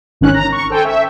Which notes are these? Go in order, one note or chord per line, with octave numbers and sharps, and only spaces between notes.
G#1 D#3 C#4 F#6
A#5
C#6
A4 C5 G5 G#5
E5